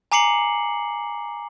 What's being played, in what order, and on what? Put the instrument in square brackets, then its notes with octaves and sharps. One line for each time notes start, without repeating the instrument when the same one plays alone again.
[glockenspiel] G#5 A#5 D6 C7 C#7 F#7